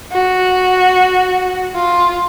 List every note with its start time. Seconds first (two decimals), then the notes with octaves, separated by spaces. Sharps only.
0.12 F#4
1.75 F4